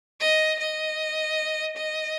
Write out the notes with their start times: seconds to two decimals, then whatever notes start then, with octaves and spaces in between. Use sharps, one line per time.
0.20 D#5
0.59 D#5
1.77 D#5